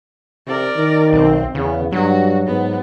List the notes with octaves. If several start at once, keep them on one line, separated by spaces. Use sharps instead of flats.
C3 A#4 D5
D#3
B1 C4
E2 C#3 B3
G2 F#3 F#4
G#2 B3